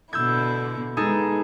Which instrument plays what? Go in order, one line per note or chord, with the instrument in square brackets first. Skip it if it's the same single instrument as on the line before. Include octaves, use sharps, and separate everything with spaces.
[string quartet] B2 D3 E4 [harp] E6 G6 G#6
[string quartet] G#3 B3 [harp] D#4 G#4 A4